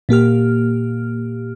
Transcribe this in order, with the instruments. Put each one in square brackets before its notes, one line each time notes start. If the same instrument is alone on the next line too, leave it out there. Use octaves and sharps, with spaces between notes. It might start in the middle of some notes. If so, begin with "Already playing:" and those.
[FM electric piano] A#2 A#3 G4 F6